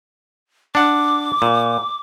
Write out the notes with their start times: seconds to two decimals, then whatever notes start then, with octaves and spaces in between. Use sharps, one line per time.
0.75 D4 F#5 D6
1.42 A#2